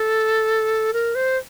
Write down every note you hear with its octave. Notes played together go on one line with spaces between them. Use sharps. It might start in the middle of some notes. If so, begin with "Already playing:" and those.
Already playing: A4
A#4
C5